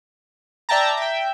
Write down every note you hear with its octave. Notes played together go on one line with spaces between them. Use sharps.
D5 E5 G5 A5 A#5
E5 G5